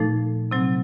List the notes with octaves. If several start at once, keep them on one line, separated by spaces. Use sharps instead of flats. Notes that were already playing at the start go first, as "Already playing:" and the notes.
Already playing: A#2 F3 A3 D#4 A4
C3 F#3 C4